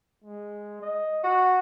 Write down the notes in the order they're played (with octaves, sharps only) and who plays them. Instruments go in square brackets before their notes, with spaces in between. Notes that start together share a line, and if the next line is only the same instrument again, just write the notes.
[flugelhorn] G#3
D#5
[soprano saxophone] F#4 [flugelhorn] F#5